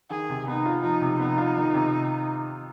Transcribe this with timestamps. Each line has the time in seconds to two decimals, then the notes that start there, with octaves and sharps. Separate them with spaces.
0.10 D#3 G#4
0.30 C3
0.47 B3 D#4
0.66 F4
0.83 F3 D#4
1.02 C3
1.19 B3 D#4
1.38 F4
1.57 D#3
1.74 C3